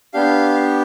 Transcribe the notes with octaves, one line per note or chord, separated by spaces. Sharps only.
B3 D4 G4 F5